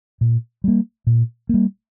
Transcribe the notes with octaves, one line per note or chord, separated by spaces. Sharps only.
A#2
G3 A#3
A#2
G3 A#3